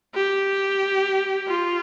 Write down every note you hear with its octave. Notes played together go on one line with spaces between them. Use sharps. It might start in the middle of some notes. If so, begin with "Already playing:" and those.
G4
F4